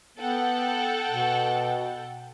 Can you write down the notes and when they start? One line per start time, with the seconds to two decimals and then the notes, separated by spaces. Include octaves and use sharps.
0.17 B3 A4 F#5 G5
1.08 B2